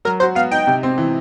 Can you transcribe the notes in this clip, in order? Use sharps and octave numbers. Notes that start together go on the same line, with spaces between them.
F#3 A#4
F#4 C5
B3 F5
D#4 G5
C3
C4
E3